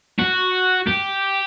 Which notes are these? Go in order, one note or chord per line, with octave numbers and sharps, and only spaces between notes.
F#4
G4